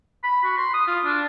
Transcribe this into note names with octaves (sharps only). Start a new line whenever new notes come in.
B5
F#4
C6
D#6
F4
D4